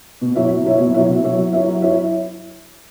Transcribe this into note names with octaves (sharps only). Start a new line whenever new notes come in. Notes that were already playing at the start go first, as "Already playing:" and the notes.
B2
F#3 E4 C#5 E5
B2
F#3 E4 C#5 E5
B2
F#3 E4 C#5 E5
B2
F#3 E4 C#5 E5
F#3
E4 C#5 E5
F#3
E4 C#5 E5